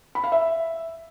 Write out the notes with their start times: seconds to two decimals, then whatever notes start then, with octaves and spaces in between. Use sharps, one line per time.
0.15 B5
0.24 F5
0.32 E5